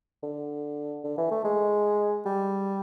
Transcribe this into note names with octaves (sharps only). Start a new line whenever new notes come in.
D3
D3
E3
A3
G#3
G3